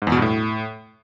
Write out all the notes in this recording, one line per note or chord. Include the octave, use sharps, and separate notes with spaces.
G#2
E2
B2
G2
A2